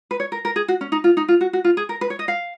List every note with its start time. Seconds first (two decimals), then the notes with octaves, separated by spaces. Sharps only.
0.11 B4
0.20 C#5
0.32 A#4
0.45 A#4
0.56 G#4
0.68 F#4
0.81 C#4
0.92 D#4
1.04 F4
1.17 D#4
1.28 F4
1.41 F#4
1.53 F#4
1.64 F4
1.77 G#4
1.89 A#4
2.01 B4
2.10 C#5
2.19 D#5
2.28 F5